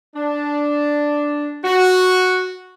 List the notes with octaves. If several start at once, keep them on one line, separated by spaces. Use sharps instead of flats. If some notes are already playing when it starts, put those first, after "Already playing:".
D4
F#4